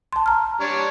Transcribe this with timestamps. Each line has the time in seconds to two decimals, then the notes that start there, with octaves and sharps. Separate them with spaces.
0.13 A5 C6
0.26 A#5 F6
0.61 G3 D4 C#5